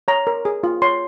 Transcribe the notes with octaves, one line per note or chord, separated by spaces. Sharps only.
C#5 A#5
A#4
G#4
F4
C#5 C6